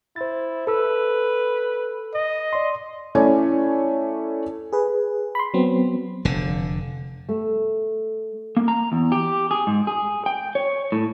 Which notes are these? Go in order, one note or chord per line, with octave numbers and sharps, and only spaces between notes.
E4 C5 A6
A4 B4 E6
D#5
D5 C6
A3 C#4 E4 C#5 D5 G#5
G#4 B4
B5 C6
F#3 B3 C4
F1 D3
A3
A#3
A#5
E2
G4
G#4
G#2
G#4
G5
C#5
A2